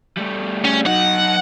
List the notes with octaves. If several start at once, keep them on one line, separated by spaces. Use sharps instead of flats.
G3 A3
C#4
F#3 D#4 F#5